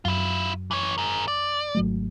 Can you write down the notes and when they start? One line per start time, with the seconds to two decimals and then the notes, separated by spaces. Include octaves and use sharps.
0.05 F#2 E4 F4
0.71 E3 C#5
0.98 G#4 A#4
1.28 D5
1.75 G#1 F#3 A3